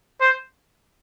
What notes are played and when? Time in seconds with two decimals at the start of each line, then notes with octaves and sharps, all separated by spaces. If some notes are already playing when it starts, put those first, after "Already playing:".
0.21 C5